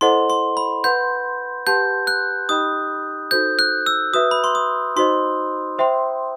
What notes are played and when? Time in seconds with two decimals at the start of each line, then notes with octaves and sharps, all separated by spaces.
0.01 E4 A4 C5 D#5 F#5 C6
0.30 C6
0.57 B5
0.84 B4 F#5 C6 G6
1.67 G4 B4 F#5 A5 C6 G6
2.07 F#6
2.49 D#4 G4 D#5 G5 B5 D#6
3.31 D#4 F#4 A4 C5 G6
3.59 F#6
3.86 E6
4.13 F#4 B4 E5 D#6
4.31 B5
4.44 C6
4.55 D#6
4.96 D#4 F#4 C5 D#5 C6
5.79 C5 E5 G5 C6